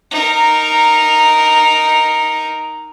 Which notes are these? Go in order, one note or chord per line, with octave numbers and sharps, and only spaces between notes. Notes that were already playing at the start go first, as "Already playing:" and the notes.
D#4 A#4